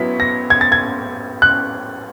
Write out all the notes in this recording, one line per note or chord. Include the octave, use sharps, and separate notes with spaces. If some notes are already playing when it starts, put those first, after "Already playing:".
Already playing: F#3 B3 E4 B6
A#6
G#6
A6
G#6
F#6